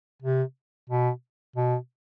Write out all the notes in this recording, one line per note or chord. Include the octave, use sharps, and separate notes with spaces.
C3
B2
B2